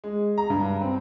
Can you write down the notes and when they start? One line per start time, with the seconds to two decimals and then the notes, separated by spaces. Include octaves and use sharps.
0.04 G#3
0.38 A#5
0.50 G2
0.81 C4